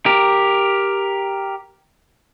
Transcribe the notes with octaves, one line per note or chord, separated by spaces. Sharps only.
G4 A#4